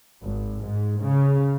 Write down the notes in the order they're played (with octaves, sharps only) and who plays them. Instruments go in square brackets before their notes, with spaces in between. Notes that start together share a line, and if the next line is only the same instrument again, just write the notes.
[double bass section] G#1
G#2
C#3